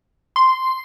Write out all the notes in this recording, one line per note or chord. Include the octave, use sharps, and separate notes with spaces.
C6